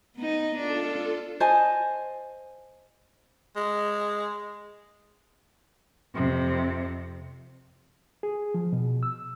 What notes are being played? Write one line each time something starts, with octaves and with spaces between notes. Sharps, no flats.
B3 D#4
D4 F4 A4
C5 D#5 G#5 A5
G#3
F2 C3
G#4
F3
B2
E6